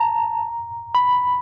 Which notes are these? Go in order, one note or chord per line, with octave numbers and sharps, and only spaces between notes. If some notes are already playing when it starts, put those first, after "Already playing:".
Already playing: A5 A#5
B5